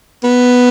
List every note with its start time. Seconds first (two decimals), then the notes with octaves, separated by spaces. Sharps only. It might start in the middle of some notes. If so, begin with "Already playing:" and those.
0.24 B3